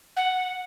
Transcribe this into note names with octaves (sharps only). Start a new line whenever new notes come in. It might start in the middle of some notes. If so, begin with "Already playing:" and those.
F#5